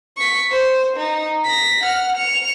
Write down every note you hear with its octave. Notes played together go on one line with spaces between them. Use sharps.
C#6 B6
C5
D#4
A#6 B6
F#5 F6
C#7 F7